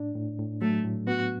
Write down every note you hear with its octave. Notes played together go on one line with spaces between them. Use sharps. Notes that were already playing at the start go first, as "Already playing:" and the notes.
Already playing: A2 D4
A2
A2
F#3 A3
A2
B3 F#4